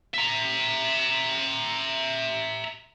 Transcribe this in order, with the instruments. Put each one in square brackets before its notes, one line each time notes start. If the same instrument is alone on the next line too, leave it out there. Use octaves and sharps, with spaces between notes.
[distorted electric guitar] E5 A#5